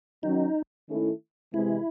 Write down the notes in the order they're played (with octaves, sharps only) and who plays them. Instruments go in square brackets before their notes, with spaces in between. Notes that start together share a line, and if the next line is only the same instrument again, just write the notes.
[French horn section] D#3 F#3 C#4 [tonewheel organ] D#4
[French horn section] D#3 A3 C#4 E4 A4
[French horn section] C3 E3 G#3 [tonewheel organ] E4